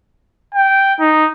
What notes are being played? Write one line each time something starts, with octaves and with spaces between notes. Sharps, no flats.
G5
D#4